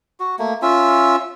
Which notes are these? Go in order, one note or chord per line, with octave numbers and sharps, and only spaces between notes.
F#4
A3 A#3
C#4 F4 E5